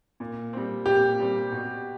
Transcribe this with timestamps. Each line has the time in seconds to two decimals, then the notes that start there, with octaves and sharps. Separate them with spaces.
0.20 A#2
0.53 G3 C4
0.86 A#2 G4
1.19 G3 C4
1.52 B2